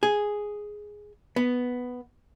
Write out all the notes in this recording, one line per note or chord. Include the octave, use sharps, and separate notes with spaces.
G#4
B3